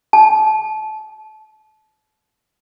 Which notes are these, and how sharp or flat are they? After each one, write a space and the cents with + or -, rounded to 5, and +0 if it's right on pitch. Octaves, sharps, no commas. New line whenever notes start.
A5 -25